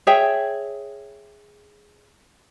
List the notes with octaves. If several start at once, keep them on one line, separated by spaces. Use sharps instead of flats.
G#4 C#5 E5 G5